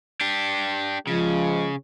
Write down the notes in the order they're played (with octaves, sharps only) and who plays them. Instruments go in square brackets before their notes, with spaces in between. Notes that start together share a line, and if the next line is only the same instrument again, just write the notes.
[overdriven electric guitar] D4 G4
[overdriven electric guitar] C#3 [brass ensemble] F3 G#3